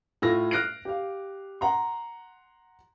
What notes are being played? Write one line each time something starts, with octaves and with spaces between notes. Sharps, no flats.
A2 A3 F4 E6 A#6
F6 F#6 A#6 C7 D7
G4 F5
F#5 A#5 C6